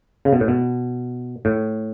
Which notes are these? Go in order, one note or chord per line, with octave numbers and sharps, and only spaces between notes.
C#3
B2
A2
B2
A2